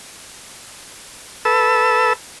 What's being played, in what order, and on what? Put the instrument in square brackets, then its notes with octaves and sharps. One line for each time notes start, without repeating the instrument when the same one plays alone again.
[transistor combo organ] A4 B4 E6